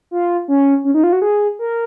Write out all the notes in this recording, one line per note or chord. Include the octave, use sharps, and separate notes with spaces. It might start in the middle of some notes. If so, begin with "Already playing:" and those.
F4
C#4
C#4
D#4
F4
F#4
G#4
A#4